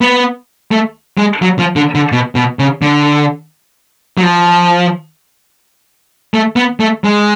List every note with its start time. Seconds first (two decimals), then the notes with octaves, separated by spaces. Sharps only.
0.01 B3
0.71 A3
1.18 G#3
1.42 F#3
1.59 F3
1.76 D3
1.95 D3
2.12 B2
2.35 B2
2.59 C#3
2.82 D3
4.18 F#3
4.23 F3
6.34 A3
6.56 B3
6.80 A3
7.04 G#3